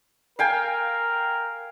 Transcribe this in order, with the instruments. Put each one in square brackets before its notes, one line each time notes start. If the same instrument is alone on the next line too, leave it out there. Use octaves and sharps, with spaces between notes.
[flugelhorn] A#4 [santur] F5 G5 G#5